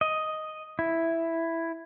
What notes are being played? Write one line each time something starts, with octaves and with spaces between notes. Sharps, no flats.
D#5
E4